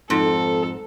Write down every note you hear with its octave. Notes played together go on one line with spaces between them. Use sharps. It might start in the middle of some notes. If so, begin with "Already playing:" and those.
F2 G#2 A4